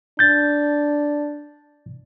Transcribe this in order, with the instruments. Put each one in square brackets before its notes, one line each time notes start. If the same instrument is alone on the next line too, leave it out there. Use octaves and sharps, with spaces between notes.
[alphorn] D4 [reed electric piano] G6 A6